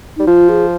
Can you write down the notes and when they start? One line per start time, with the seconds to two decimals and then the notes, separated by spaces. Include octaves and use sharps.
0.17 G3 D#4
0.27 F3 F4
0.49 G#4